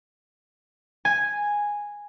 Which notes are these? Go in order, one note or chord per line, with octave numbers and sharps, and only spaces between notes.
G#5